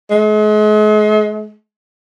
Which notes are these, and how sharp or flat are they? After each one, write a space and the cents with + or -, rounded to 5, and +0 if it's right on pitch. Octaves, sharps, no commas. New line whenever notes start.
G#3 +40